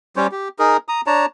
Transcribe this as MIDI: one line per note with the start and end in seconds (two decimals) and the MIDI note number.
0.16 0.27 55
0.16 0.27 61
0.16 0.27 72
0.16 0.27 73
0.31 0.48 67
0.59 0.77 63
0.59 0.77 68
0.59 0.77 70
0.88 1.01 82
0.88 1.01 87
1.07 1.26 62
1.07 1.26 73
1.07 1.26 81
1.07 1.26 82